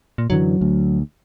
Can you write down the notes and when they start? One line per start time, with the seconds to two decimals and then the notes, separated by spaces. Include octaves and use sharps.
0.18 A#2
0.30 F#2 D3 E3 F#3
0.61 D2